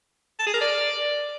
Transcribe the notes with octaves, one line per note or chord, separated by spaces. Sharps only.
A5
G#4
A#4
D5